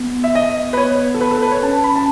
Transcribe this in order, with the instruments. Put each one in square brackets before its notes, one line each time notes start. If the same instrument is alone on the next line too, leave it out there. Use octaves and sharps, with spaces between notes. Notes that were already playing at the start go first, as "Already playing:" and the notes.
Already playing: [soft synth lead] B3
[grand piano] E5
D#5
B4
C#5
A4
B4
A4
B4
C#5
[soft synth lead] C#4 [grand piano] A5
[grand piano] B5
A5